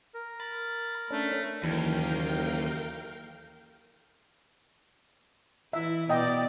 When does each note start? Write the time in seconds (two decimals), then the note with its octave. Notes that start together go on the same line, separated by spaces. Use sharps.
0.14 A#4
0.40 B5 A6
1.11 A3 C#4 D4
1.64 F#1 D#2 E3 A#4 F5 G5
5.73 E3 E4 E5
6.09 B2 D5 D#5 G5